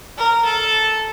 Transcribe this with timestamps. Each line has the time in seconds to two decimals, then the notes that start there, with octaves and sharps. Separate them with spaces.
0.18 A#4
0.45 A4